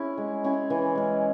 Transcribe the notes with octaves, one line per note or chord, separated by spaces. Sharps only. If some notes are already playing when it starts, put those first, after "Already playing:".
Already playing: C#4 E4 G#4
G#3
C#4 E4 G#4
E3
G#3 C#4